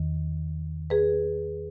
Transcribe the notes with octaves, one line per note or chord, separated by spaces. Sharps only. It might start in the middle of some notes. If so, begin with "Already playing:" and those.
Already playing: E2 D#3
G#4 B4